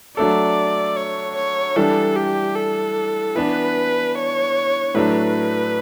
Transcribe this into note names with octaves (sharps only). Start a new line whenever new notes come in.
F#3 A3 D4 A4 D5
C#5
C#5
E3 G3 D4 A4
G4
A4
E3 B3 D4 B4
C#5
A2 F#3 A3 D4 F#4 B4